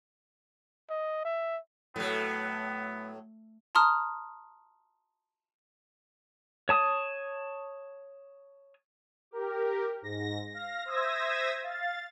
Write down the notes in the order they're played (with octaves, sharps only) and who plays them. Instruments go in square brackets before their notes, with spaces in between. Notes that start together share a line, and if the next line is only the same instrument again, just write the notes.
[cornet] D#5
E5
[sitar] A2 F#3 [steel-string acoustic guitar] A3 [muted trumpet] B3
[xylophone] A5 A#5 C6 D#6 F6
[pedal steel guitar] C#5 A5 D#6
[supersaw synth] G4 A#4
G#2 A#6
F5 A#6
C5 E5 D#6 E6 G#6 A#6
F5 A6